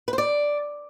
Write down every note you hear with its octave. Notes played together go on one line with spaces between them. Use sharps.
B4
C5
D5